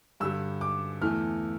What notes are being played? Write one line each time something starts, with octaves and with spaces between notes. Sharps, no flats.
G2 D3 G3 E6
D6
E2 E3 A3 F6